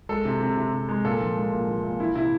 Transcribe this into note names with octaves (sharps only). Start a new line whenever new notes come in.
G#3 A4
C3
C3
C3
C3
G#3
A#2 A4
F3
G#3
A#2
F3
A#2
E3 E4
C3 E4